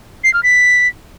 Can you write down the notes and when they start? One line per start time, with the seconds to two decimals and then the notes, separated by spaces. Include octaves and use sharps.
0.24 C7
0.33 F6
0.43 B6